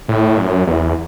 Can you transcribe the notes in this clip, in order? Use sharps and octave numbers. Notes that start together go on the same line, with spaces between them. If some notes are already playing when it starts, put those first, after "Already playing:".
A2
F#2
E2